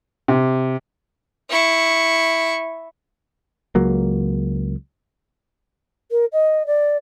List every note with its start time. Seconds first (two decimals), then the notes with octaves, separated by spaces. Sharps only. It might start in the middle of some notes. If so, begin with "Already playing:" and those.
0.28 C3
1.50 E4 C#6
3.75 C#2 F#3 A#3
6.11 A#4
6.33 D#5
6.67 D5